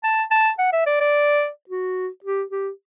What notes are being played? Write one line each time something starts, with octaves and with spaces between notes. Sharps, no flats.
A5
A5
F#5
E5
D5
D5
F#4
G4
G4